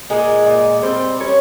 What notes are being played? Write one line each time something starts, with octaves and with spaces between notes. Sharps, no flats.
A#2 G#3 G#4
A#2
G3 C4 C5
G3 C#4 C#5